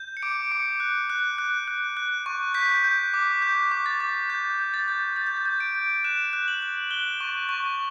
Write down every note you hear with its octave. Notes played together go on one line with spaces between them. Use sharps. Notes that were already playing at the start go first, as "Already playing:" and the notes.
Already playing: G6
C#7
D6 D7
D6 C#7
F#6
F#6
F#6
F#6
F#6
C#6
G6 B6
G6
D6
G6
D6
A6
D6
G6
G6
A6
G6
G6 A6
G6
A6
G6
D7
G6
F#6 E7
F#6
F#7
F#6
F#6 G7
C#6
C#6